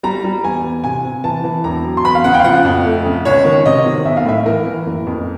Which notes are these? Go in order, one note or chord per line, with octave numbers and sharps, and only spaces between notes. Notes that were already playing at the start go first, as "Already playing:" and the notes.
G3 A#5
G3
E2 G#5
E2
C3 G#5
C3
E3 A5
E3
E1 A#5
F#3
C6
E2 B5
F5
C#3 F#5
G5
F5
F3 F#5
F2
A3
C#3
C#2 C#5
D#3
C3 D#5
D#3
B1 E5
F5
A2 E5
E3 A#4
E3
F#1
F2